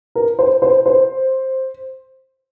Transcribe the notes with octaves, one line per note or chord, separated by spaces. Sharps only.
A#4
C5
C5
C5